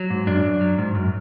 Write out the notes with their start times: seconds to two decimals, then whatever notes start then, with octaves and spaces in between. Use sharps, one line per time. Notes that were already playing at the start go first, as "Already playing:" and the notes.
Already playing: F#3
0.10 G#2
0.27 F#2 D4
0.44 F#2
0.61 F#3
0.78 G#2
0.95 F#2